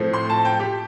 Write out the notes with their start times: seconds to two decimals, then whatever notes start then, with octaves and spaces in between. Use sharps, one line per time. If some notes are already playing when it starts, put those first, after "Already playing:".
Already playing: A2 F3 A3 C4
0.13 C6
0.30 A5
0.45 G5
0.60 G4